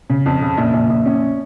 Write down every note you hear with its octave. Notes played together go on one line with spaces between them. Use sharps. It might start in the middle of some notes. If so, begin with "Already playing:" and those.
C#3
F2
C#3
A#1
A#1
A#1
C#4